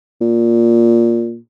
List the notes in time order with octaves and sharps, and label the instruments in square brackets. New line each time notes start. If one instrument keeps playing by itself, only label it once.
[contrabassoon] A#2